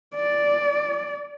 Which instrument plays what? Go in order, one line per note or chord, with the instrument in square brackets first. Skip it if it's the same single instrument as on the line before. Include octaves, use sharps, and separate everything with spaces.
[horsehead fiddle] D5